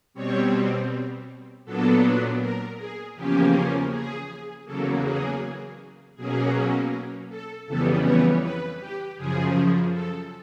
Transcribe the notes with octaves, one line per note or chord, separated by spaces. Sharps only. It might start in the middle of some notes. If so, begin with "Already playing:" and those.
B2 G3 C4 C#5
A#2 F#3 B3 D4 A4
A#4
G#4
E2 C#3 F3 A#3 C#4 G4
G#4
E2 C#3 F#3 A#3 A4
G#4
B2 F#3 A#3 C#4 G#4
A4
F2 C#3 E3 G3 B3 A4
C#5
B4
G4
F#2 C#3 F3 G#4
A4